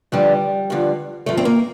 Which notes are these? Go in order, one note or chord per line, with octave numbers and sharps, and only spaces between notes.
G2 D3 F3 G3
G2 D3 F3
G2 D3 F3 A3
C4
A#3